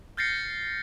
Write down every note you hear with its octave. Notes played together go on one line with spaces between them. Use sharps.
F6 G6 A6 A#6 C7 C#7